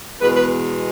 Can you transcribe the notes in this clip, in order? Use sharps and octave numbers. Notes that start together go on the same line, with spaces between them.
E2 B2 G#3 B4
B4